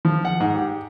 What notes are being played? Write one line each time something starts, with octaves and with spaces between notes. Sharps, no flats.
F3
F#5
G#2
G4